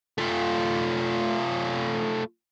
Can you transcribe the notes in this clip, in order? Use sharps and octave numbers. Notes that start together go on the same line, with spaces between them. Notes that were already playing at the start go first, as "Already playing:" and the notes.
A3 F4